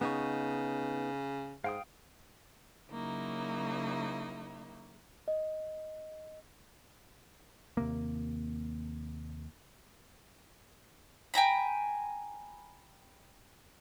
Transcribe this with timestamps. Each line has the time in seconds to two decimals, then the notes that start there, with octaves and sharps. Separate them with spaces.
0.01 C#3 B3 D#4 C#6
1.64 G#2 F5 G5 D#6
2.91 C#3 F#3 A#3 D#4 E4
5.28 D#5
7.77 D#2 C3 A#3
11.34 G5 G#5 A#5 B5